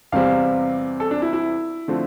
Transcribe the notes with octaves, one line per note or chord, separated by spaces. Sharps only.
E2 C3 G3 C4 F5
A4
D4
E4
E4
D3 F3 A3 C4